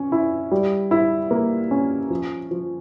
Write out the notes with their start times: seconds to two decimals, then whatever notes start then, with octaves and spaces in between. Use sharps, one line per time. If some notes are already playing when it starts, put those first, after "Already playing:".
Already playing: C#4
0.12 E4
0.51 G3
0.91 E4
1.31 A#3
1.71 C#4
2.10 F3
2.51 F3